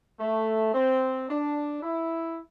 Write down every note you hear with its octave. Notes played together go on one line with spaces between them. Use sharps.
A3
C4
D4
E4